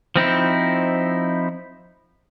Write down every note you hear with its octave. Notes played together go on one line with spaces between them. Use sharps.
F3 C4 D#4 E4